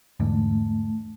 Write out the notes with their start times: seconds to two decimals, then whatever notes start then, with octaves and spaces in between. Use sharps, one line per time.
0.20 E2 G#2 D3 A3